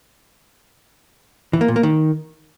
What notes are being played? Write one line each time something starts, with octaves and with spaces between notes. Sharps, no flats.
E3
A#3
A#2
A#3
D#3